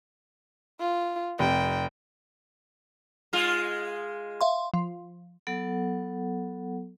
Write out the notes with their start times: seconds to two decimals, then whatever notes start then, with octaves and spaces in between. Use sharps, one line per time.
0.80 F4
1.39 F1 G5
3.33 G#3 F4
4.41 E5 F5 C6
4.74 F3
5.47 F#3 B3 A4 F#5